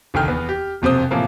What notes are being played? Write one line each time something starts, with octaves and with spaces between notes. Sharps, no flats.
F1 D2 D#3 G5 F6
E2 B3
G4
E1 F2 C3 C5 D#6
A2 C3 E3 F3 A#3